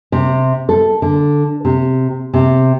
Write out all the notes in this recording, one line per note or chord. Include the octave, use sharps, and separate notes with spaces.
C3
A4
D3
C3
C3